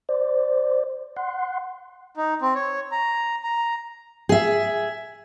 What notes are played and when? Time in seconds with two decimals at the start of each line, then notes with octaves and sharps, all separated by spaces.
0.09 C5 D5
1.17 F#5 C6
2.17 D#4
2.42 C4
2.55 C#5
2.92 A#5
3.43 A#5
4.29 G#4 E5